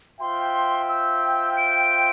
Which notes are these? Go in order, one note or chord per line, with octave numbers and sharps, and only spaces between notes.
F4 C5 E5 G5 C6
E6
D7